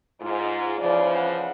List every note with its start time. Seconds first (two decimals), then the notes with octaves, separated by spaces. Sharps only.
0.22 G#2 F4
0.80 C#3 E3 F3 D5
1.17 F#5